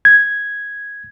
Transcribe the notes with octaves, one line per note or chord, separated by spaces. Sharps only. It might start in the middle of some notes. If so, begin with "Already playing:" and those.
G#6